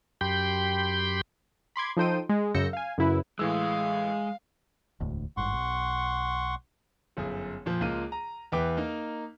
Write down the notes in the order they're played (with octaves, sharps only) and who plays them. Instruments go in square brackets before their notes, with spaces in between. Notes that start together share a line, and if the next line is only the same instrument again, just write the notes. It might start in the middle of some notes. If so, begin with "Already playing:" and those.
[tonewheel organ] F#2 G4 G5 B5 C6 G6
[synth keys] B5 C6 D6 G#6
F3 D#4 A4 C5 G5 D#7
G#3
F#2 C#3 E6 G6 A#6 C#7
F5 G#5
F#2 C#3 E4 B4
[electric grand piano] A2 E3 E6 [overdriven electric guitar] G#3 [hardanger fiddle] F5
[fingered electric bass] E1 D2 A2
[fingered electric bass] G#1 G2 [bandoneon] F#5 C6 C#6
[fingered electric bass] B1
[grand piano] G1 F#2 G#4
F2 A#2 F3
C#2 A#3 F4 D#7
A#5
E2 E4 B4 E5 G5 D6
A#3 D#4